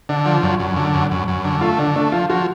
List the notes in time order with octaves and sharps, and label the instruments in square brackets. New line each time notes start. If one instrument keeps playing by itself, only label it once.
[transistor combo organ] D3 [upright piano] D4
[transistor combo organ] F3
F#2
F#2
D3
F#2
F#2
F#2
D3
[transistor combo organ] A3 [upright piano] F4
[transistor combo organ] D3 [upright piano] D4
[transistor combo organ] A3 [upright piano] D4
[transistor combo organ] F3 [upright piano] F4
[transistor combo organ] F3 [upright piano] F#4